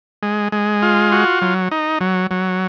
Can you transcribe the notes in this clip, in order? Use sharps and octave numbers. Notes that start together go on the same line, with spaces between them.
G#3
G#3
F4
F#4
F#3
D#4
F#3
F#3